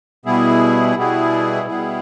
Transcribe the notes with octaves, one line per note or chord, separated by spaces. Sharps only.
B2 G3 B3 E4 G#4
B2 G3 B3 E4 G#4
B2 G3 B3 E4 G#4